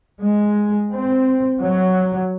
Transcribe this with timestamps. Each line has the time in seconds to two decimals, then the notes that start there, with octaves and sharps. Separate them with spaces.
0.20 G#3
0.92 C4
1.59 F#3